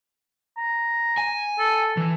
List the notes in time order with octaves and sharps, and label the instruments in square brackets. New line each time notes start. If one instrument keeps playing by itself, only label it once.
[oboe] A#5
[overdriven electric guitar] G#5
[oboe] A4
[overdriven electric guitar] E3